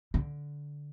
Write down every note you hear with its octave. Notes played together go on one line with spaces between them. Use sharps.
D3